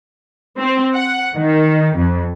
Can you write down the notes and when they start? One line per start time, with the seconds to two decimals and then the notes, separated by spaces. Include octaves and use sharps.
0.59 C4
0.95 F#5
1.36 D#3
1.97 F2